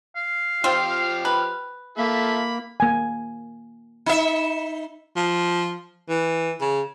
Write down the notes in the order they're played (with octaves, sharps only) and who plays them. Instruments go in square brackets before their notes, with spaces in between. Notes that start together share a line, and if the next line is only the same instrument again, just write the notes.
[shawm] F5
[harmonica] F3 G4 F6 [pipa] C4 F4
[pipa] B4
[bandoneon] A#3 [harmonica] F4 A4 E5 [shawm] B5
[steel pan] A#3 G#5
[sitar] D#4 E5
[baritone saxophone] F3
E3
C#3